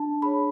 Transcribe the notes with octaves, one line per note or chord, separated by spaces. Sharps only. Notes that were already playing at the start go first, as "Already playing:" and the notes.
Already playing: D4 A5
G#4 C#5 B5